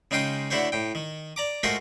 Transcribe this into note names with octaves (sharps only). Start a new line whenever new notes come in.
C#3 G#3 D#4 F4 G5 C6
D3 A3 E4 F#4 C5 C#5
A2 G5
D#3
D5 A#5 D6
G#3 A3 F4 F#4 A#4 C5